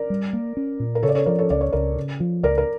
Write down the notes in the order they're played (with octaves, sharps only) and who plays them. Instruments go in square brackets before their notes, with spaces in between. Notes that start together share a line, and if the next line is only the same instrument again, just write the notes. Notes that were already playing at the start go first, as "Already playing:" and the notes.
Already playing: [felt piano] A#4 D5
[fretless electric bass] G3
A#3
C#4
A#2
[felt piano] A#4
[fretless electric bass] C#3 [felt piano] A4 C#5
[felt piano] D5
A4 C#5
[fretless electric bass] F3 [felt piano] A#4 D5
[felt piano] A4 C#5
[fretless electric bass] C#2 [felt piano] D5
[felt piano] C#5
[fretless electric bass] C#2 [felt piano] A#4 D5
[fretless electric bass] C#3
F3
[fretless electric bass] C#2 [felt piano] A#4 D5
[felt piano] A#4